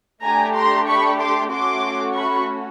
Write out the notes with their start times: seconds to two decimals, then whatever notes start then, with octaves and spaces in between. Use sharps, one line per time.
0.24 A3 D4 G4 G#5 A#5
0.55 A#5 C6
0.88 B5 C#6
1.19 C6 D6
1.51 A3 C#4 F#4 C6 D6
2.15 B5 C#6